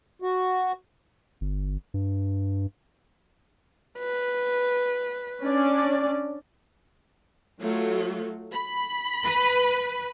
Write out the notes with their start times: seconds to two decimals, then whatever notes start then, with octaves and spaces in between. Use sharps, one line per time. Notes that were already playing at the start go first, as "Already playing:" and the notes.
0.22 F#4
1.41 G1
1.94 G2
3.98 B4
5.41 C#4 D4 D5
7.60 F#3 A3 F4
8.53 B5
9.25 B4